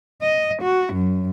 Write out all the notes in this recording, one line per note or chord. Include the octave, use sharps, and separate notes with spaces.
D#5
F#4
F#2